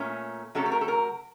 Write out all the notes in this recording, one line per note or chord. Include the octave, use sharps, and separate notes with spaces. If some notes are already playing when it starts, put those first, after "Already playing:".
Already playing: A#2 A3 C#4
C3 F#3 A3 C#4 A4
A4
A#4
A4
A#4